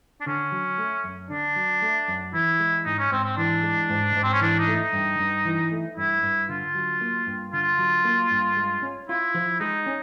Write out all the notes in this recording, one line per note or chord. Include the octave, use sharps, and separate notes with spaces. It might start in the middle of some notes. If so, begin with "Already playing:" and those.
D4
D3 C#4
F#3
A3
F#2
D3 D4
F#3
A3
F#2
E3 E4
G#3
G#2 D#4
C#4
G#2 C4
C4
E3 D4
G#3
G#2
G#2
C4
C#4
E3 D4
D#4
A3
D#4
G2
G2
E3
A3
G2 E4
G2
D3 F4
F#3
A#3
G2
D3 F4
F#3
A#3
G2
G#3
C#4
E4 F4
F3
G#3 D#4
C#4